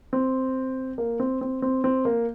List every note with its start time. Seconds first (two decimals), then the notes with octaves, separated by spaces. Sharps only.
0.13 C4
0.98 A#3
1.20 C4
1.41 C4
1.62 C4
1.84 C4
2.05 A#3